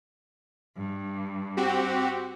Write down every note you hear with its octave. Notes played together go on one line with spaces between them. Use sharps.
G2
C4 F#4 G4